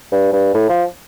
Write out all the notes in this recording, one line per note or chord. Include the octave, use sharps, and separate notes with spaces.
G2
G2
A2
F3